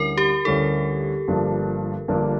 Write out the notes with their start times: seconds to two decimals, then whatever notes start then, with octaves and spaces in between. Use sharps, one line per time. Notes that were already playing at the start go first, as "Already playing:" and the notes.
Already playing: D2 D3 G3 C#4 E4 A#4
0.17 G4
0.45 D2 D3 G3 C#4 E4 A4
1.28 G1 G2 F3 A#3 D4
2.08 G1 G2 F3 A#3 D4